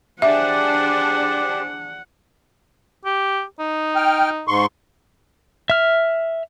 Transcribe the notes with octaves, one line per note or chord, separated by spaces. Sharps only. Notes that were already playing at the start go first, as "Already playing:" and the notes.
D4 G4 G#4 C5 E5 F#5
G4
D#4
G5 F6
G#2 C6 C#6
E5 F6